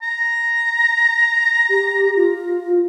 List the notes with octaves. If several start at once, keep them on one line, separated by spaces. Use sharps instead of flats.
A#5
G4
F4